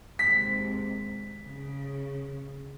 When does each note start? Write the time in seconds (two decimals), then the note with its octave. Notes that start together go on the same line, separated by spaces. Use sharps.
0.19 D#2 G#2 C3 B6
1.45 C#3